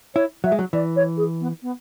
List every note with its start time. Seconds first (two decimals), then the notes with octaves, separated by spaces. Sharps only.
0.15 E4 C#5
0.44 F#3 E5
0.52 G#3
0.59 F#3
0.73 E3 D5
0.96 C#5
1.17 G#4
1.40 B3
1.62 B3